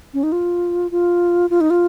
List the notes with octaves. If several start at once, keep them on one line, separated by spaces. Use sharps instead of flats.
C#4
D#4
F4
F4
F4
D#4
F4